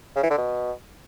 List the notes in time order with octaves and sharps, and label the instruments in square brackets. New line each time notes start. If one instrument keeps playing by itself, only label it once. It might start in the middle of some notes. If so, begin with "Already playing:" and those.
[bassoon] C#3
E3
D3
B2